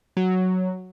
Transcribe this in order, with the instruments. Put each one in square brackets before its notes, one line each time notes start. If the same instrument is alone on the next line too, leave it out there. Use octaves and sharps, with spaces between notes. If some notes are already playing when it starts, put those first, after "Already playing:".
[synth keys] F#3